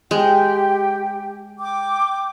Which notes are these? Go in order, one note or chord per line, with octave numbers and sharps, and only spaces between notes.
G#3 G4 G5
G5 D6